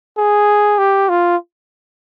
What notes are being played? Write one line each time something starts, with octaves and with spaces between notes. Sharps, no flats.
G#4
G4
F4